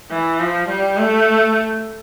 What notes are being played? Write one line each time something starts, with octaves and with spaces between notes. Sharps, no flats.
E3
F3
G3
A3